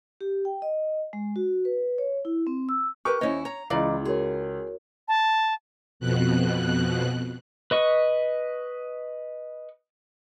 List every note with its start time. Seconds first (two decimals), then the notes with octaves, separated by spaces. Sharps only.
0.21 G4
0.45 G5
0.62 D#5
1.13 G#3
1.36 F#4
1.65 B4
1.98 C#5
2.25 E4
2.47 C4
2.69 E6
3.05 G4 A#4 B4 C#6
3.21 D#2 C#4 E4 C5 C#5 D#5
3.45 C#5 A#5
3.70 C#2 E3 D5 D#5 F5 A#5 D6
4.05 F#4 G#4 A#4 C#5
5.08 A5
6.00 F2 B2 F#6
7.71 B4 D#5 C#6